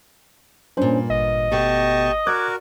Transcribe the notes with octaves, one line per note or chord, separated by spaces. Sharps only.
G2 A#2 C#4 D4 C5
G#1 D#5
B2 A3 G4 A5 C#6
F#4 A#4 D5 D6 F#6 G#6